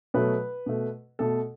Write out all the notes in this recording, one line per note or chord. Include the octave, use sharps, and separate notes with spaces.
B2 F#3 A3 B4
B2 A3
B2 A3 A4